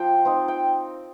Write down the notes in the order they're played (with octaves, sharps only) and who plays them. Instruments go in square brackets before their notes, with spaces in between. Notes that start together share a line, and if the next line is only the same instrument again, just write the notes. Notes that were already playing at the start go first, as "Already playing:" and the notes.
Already playing: [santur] F3 F4 G5
C4 D#4
G5